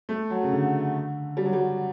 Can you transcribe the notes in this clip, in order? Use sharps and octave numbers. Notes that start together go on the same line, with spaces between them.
A3
F#3
C#3
D3
G3
F#3
G3